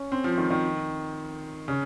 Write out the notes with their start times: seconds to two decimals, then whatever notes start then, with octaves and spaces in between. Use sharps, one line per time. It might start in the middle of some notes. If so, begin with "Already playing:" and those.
Already playing: C#4
0.12 C4
0.24 F3
0.38 D#3
0.50 D#3
1.68 C#3